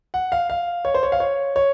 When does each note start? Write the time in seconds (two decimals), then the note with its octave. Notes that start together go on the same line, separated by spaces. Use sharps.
0.14 F#5
0.32 F5
0.50 F5
0.85 C#5
0.94 C5
1.03 C#5
1.12 F5
1.20 C#5
1.56 C#5